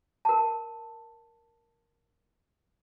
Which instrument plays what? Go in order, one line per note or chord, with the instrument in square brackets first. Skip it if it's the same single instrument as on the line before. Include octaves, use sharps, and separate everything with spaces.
[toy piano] A#4 A5